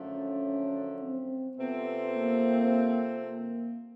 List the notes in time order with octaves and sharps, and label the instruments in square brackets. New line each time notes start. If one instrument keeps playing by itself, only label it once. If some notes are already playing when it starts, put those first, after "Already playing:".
Already playing: [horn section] F#2 D3 F3 A3 D4 [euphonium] C#4
[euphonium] C4
[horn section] C3 F3 A3 C4 [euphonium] B3
[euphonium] A#3
A#3